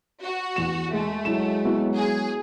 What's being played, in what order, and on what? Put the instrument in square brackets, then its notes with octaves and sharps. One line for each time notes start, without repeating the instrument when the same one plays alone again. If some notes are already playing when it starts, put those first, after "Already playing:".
[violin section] F#4
[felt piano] E2 E7
[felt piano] G#3 [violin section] A3
[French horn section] F#3 G#3 [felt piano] E4 E7
[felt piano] B3 E4 F#4
[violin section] G#4